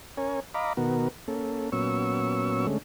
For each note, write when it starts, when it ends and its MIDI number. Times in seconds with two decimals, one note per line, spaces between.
0.17 0.40 61
0.17 0.40 70
0.17 0.40 73
0.17 0.40 80
0.54 0.73 75
0.54 0.73 77
0.54 0.73 82
0.54 0.73 83
0.54 0.73 86
0.77 1.08 47
0.77 1.08 51
0.77 1.08 59
0.77 1.08 66
0.77 1.08 70
1.28 1.70 58
1.28 1.70 61
1.28 1.70 69
1.72 2.67 46
1.72 2.67 54
1.72 2.67 59
1.72 2.67 61
1.72 2.67 85
1.72 2.67 88
2.67 2.78 50
2.67 2.78 56
2.67 2.78 57
2.67 2.78 61